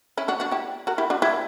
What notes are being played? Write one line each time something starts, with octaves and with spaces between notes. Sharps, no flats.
C#4 E4
D4 F#4
D4 F#4
E4 G4
F#4 A#4
E4 G4
D4 F#4
E4 G4